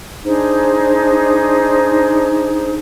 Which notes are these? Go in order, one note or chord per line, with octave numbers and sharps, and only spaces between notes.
D4 D#4 G#4 C5